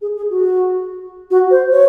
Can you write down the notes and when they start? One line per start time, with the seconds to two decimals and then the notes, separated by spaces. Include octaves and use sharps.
0.02 G#4
0.17 G#4
0.30 F#4
1.31 F#4
1.51 C5
1.72 C#5